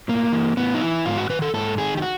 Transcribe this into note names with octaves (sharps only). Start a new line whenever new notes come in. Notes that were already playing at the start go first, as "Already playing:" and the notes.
A2 A#3
E3
A2 B3
D#4
E3 E4
G#2 F4
F#4
D#3 B4
A4
G#2 A4
D#3 G#4
G4
F#4